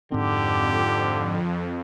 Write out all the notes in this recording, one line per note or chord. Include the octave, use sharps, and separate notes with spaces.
F2 G#2 D3 C4 G4